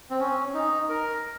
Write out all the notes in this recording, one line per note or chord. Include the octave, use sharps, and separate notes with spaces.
C4
C#4
D#4
A#4